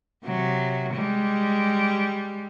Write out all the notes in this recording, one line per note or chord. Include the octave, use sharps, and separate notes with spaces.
C3 F#3
G3 G#3